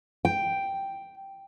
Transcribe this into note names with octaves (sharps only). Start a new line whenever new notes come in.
G5